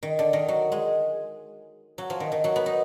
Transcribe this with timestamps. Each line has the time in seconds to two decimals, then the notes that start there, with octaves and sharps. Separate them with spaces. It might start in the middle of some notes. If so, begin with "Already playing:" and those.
0.03 D#3
0.19 D3
0.33 D#3
0.48 F#3
0.72 G#3
1.98 F#3
2.10 F3
2.20 D#3
2.32 D#3
2.44 F#3
2.56 B3
2.66 D#4